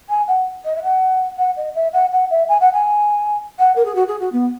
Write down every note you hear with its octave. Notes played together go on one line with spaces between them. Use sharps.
G#5
F#5
D#5
E5
F#5
F#5
D#5
E5
F#5
F#5
E5
G#5
F#5
G#5
F#5
A#4
G#4
F#4
G#4
F#4
B3